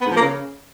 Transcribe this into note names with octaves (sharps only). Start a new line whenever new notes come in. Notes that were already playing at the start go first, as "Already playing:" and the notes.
B3
G#2
F3
A#3
C#3